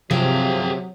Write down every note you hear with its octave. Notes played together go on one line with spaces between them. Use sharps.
C3 F3 F#3 C4 G#4 F5 G5